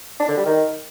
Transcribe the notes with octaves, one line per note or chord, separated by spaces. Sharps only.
D4
D3
G3
D#3